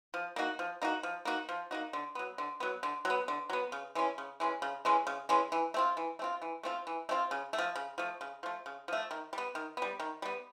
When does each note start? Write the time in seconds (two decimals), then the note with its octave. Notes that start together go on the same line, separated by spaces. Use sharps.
0.14 F3
0.36 A#3 D#4 F#4
0.59 F3
0.82 A#3 D#4 F#4
1.03 F3
1.25 A#3 D#4 F#4
1.49 F3
1.71 A#3 D#4 F#4
1.93 D3
2.15 F#3 B3
2.38 D3
2.60 F#3 B3
2.83 D3
3.05 F#3 B3
3.28 D3
3.50 F#3 B3
3.72 C#3
3.95 E3 G#3 C#4
4.18 C#3
4.40 E3 G#3 C#4
4.62 C#3
4.85 E3 G#3 C#4
5.07 C#3
5.29 E3 G#3 C#4
5.52 E3
5.74 A3 C4 F4
5.97 E3
6.19 A3
6.22 C4 F4
6.42 E3
6.63 A3 C4 F4
6.87 E3
7.09 A3 C4 F4
7.31 C#3
7.53 A3
7.58 F3
7.76 C#3
7.98 F3 A3
8.21 C#3
8.43 F3 A3
8.66 C#3
8.88 F3 A3
9.11 D#3
9.33 G3
9.38 B3
9.55 D#3
9.77 G3 B3
10.00 D#3
10.22 G3 B3